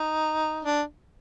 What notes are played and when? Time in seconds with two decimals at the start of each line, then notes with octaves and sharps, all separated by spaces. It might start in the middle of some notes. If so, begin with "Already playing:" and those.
Already playing: D#4
0.65 D4